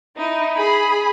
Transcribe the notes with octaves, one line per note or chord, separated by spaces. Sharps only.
D#4 E4
G#4 B5